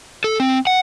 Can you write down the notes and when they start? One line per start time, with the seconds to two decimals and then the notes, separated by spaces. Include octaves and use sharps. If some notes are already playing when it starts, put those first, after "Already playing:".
0.24 A4
0.40 C4
0.67 F#5